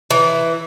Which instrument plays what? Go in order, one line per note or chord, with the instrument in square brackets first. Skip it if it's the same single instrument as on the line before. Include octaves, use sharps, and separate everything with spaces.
[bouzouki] E3